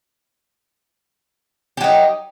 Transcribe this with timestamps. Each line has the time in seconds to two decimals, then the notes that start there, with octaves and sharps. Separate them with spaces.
1.77 G4
1.81 F#3
1.84 D#4